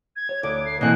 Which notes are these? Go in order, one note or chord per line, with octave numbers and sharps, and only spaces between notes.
G#6
C#5
D2 D6
C7
B2 E3 A#3 C4 F#6